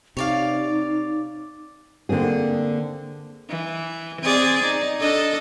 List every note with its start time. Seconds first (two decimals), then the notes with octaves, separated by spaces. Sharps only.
0.17 C3 D#4 C#5 D5 F5
2.09 D3 A#3 C4 G#4
3.49 E3
4.22 C4 G#4 D5
4.63 D#4
5.00 D4 A4 D#5